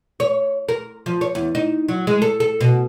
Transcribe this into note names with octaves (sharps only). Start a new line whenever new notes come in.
C#5
A#4
F3
C#5
E2
D#4
F#3
G#3
A4
A4
B2